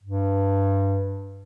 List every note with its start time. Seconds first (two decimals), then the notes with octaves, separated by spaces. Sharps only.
0.04 G2